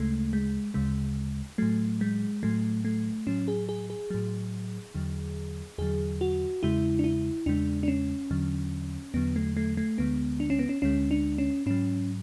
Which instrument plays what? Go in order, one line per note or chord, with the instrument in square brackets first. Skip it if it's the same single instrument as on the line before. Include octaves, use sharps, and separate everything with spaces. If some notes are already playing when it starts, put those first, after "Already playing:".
Already playing: [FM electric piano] D2 C#3 G#3 A3
G#3
D2 C#3 G#3
A2 F#3 A3
G#3
A2 F#3 A3
A3
A2 F#3 C#4
G#4
G#4
G#4
A2 F#3
E2 D3 F#3
E2 D3 F#3 G#4
F#4
E2 C#3 G#3 E4
D4
E4
E2 C#3 G#3 D4
D4
C#4
E2 D3 F#3
E2 D3 F#3 B3
A3
A3
A3
D2 D3 G#3 B3
D4
C#4
B3
C#4
D2 D3 G#3 C#4
D4
C#4
G#2 F#3 C#4